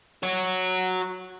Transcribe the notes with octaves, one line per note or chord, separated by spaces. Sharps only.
F#4 C#5